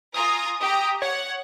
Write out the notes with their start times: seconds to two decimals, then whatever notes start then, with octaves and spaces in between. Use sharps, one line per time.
0.14 F4 G#5 A#5 D#6
0.61 G4 A#5
1.02 C#5 F#5